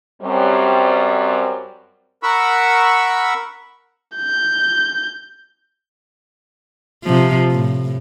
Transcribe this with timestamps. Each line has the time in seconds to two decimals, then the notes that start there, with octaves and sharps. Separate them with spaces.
0.22 F#2 G3 C4
2.23 A#4 F#5 B5 C#6 E6
4.17 G6
7.04 C3 F3
7.51 A2